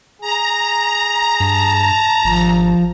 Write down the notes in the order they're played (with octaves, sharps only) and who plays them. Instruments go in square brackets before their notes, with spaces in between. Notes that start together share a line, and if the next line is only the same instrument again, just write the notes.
[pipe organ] G#4 [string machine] A#5
[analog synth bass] G2 [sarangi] A5
[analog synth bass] G#1 [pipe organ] F3